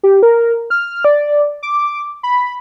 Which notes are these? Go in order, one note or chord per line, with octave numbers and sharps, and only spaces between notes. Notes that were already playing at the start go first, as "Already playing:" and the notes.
G4
A#4
F6
D5
D6
B5